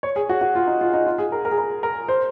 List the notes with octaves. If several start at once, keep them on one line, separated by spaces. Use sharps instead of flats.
C#5
G#4
F#4
F#4
F4
D#4
F4
D#4
F4
G#4
A#4
A#4
G#4
A#4
A#4
C5